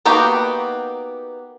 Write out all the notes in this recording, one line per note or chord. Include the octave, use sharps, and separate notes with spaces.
A#3 B3 D#4 F#4 G4